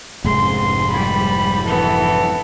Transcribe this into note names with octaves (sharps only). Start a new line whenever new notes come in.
F1 G#2 G#3 C6
G3 B5
E3 B3 A4